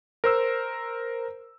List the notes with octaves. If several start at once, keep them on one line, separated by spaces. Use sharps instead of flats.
A#4 C5 E6